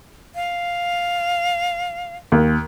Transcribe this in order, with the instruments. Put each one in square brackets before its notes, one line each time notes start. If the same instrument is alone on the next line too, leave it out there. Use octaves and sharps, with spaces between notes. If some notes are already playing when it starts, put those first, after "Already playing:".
[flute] F5
[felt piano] D#2